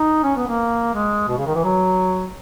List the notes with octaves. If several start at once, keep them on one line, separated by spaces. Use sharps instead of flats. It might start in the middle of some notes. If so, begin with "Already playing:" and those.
Already playing: D#4
C#4
B3
A#3
G#3
B2
C#3
D#3
E3
F#3